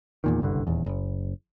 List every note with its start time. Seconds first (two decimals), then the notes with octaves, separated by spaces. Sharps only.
0.24 E2 A#2 D#3
0.41 F#1 C2 G2 D3
0.67 D#1 E2
0.86 F#1